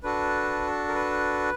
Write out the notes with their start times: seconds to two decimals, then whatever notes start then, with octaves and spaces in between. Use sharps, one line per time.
0.03 D4 F#4 A4 B4
0.88 A#4
0.95 B4